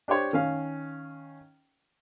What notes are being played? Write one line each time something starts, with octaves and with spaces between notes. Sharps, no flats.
D4 G4 C5 C#5
D#3 C#4 F5